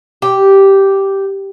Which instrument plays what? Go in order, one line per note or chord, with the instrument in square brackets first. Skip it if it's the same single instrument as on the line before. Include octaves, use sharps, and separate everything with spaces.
[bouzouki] G4